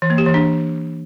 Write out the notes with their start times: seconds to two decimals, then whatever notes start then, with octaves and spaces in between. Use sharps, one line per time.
0.02 E3
0.10 A#3
0.18 G4
0.26 E3
0.34 D4